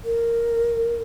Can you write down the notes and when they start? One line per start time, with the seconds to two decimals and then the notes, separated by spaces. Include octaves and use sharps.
0.05 A#4